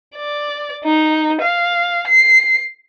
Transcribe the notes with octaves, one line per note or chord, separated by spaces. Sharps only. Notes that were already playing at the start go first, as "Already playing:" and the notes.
D5
D#4
F5
C7